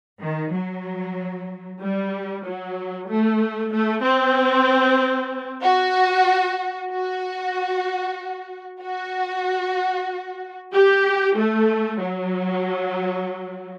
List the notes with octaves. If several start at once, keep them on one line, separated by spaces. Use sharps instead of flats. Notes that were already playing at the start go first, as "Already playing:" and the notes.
D#3
F#3
G3
F#3
A3
A3
C4
F#4
F#4
F#4
G4
A3
F#3